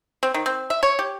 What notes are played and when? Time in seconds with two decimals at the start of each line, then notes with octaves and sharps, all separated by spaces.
0.23 C4
0.34 D#3
0.46 C4
0.70 E5
0.83 C#5
0.99 G4